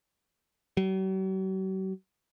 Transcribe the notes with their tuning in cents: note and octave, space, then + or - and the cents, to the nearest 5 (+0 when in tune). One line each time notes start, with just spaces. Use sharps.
F#3 +45